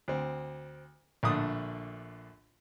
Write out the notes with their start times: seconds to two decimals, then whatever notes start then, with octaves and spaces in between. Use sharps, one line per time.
0.08 D2 C4
1.23 A#1 D3 A3 D#6